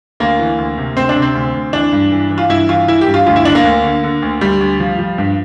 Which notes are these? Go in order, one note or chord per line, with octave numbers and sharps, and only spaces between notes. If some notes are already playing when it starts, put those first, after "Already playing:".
D2 A#3
E3
D2
C3
D2 C4
D4
C3
C4
D2
D2
E3 D4
G2
E3
E3
F4
G2 E4
E3 F4
E3 E4
G4
G2
F4
D2 F4
E4
D3 D4
A#3
D2
D3
D3
D2
D2 G3
D2
F3
F3
G2